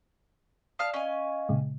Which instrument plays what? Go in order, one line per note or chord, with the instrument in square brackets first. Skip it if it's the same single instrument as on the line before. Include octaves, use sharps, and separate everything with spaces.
[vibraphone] D5 [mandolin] F5 A5 F6 [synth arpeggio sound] D#6
[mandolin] C#4 G#5 [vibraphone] D#5 F5
[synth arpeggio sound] A#2 C#3 G#3